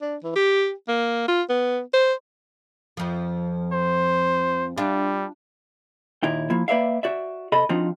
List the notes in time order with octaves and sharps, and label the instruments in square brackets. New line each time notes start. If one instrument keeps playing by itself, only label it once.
[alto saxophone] D4
E3
G4
A#3
F4
B3
C5
[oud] F2 F3
[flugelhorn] C5
[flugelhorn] G3 [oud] D4 F4
[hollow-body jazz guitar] D#2 A#2 D#4 E4 G5
F3 A#3 E4
A#3 B4 D5 E5 F5
F#4 D5 E5
C3 A4 D#5 B5
F3 C4 D4 D#4 F4 F#4